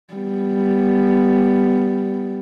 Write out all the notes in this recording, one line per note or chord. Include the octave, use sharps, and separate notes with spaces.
G3 B3